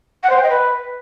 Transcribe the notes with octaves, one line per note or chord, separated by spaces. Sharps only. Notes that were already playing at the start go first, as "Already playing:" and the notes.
F#5
C5
G5
D#5
B4